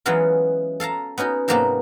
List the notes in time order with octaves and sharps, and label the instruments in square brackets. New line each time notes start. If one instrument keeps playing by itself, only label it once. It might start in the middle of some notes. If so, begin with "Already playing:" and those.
[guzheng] E3 F#3 G#3 B3 C#4 F4
A4 F5 A5 A#5
B3 C#4 D#4 F#4
G#2 C3 F#3 A#3 B3 A5